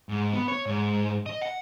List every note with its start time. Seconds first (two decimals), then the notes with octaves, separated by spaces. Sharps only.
0.09 G#2
0.33 B3
0.48 C#5
0.66 G#2
1.26 D#5
1.41 F#5